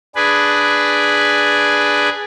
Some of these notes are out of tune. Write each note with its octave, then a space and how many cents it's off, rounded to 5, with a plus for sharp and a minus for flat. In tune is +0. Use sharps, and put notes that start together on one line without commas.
D4 +0 G#4 +0 B4 +0